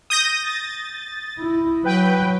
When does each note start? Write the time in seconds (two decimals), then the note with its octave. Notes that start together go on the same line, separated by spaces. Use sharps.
0.10 D#6 G6 A#6
0.44 A6
1.39 E4
1.84 F#3 B4 G5